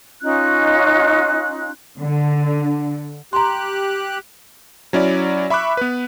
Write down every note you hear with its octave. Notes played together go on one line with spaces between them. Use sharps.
C#4 D#4 F4 F#6
D3
G4 A#5 C6 F#6
F#3 C#4 E4 D5
E5 B5 C#6 D6 F#6
B3 B4